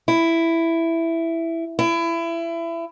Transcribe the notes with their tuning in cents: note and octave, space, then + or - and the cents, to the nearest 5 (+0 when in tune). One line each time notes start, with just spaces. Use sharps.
E4 +5
E4 +25